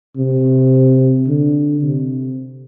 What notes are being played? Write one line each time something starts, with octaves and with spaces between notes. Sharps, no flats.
C3
D3
C3